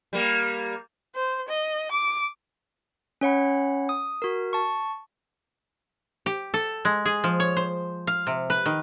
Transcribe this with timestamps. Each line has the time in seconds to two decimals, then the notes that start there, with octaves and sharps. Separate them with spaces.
0.13 G3 A#3
1.15 C5
1.48 D#5
1.91 D6
3.21 C#4 C#5 F#5 B5
3.89 D#6
4.22 F#4 A#4
4.53 A5 C#6
6.26 G4
6.54 A4
6.85 G#3
7.05 G#4
7.24 F3
7.40 C#5
7.57 C5
8.07 F5
8.27 C3
8.50 B4
8.66 D#3